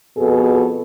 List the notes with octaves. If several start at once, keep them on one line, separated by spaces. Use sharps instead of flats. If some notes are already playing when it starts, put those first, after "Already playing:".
F2 B2 G#4 A4